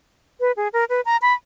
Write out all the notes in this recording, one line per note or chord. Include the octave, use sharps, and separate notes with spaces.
B4
G#4
A#4
B4
A#5
B5